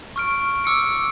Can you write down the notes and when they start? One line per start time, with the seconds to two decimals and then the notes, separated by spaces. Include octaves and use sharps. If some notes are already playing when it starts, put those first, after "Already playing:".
0.16 C#6 F6 D7
0.64 D6 E6 C#7 D7